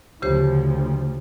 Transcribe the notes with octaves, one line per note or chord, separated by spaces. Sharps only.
D2 C#3 F3 G4 C5